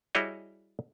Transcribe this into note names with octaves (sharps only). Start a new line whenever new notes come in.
G3 E4 F#4 G#4 C#5 D#5